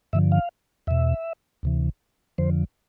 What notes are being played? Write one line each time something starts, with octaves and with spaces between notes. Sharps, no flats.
G2 D3 F3 E5
F5
E2 B2 E5
D2 C3 E3
F2 D3 F3 C5